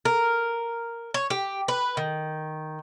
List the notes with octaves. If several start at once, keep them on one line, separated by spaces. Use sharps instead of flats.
A#4
C#5
G4
B4
D#3